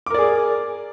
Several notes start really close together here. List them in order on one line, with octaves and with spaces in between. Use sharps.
D6 A#4 D5 G#4